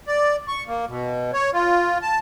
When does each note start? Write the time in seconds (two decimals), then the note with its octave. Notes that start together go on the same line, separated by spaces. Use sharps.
0.07 D5
0.48 C#6
0.67 A#3
0.88 B2
1.33 C#5
1.53 F4
2.02 A5